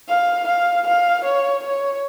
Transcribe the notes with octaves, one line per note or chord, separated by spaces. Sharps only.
F5
F5
F5
C#5
C#5